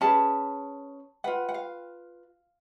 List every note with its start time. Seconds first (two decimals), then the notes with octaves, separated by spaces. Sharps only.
0.01 C#4 G#4 B4 A5
1.24 F4 B4 F#5
1.49 F#5
1.54 F5